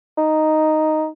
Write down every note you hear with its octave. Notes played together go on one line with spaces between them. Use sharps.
D#4